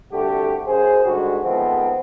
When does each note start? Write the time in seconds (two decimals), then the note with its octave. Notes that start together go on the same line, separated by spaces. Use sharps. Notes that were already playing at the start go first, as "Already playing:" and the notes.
0.12 C2 D3 A3 F#4 G4
0.67 F#2 G#4 C5
1.05 G#2 D3 G3 F#4
1.42 D#3 F3 G#3 A3 B3 C4